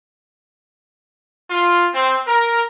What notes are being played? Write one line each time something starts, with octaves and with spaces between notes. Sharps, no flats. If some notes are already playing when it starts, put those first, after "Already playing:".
F4
C4
A#4